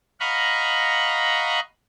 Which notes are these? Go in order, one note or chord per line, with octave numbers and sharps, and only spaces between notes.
D#5 F5 F#5 A#5 B5 C#6